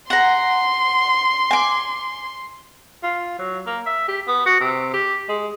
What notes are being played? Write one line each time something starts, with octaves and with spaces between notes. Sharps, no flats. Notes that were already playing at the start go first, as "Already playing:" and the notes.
F#5 A#5 C6
G#5 D6
F4
F#3
A#3
E5
G4
B3
F#4
C3
G4
G#3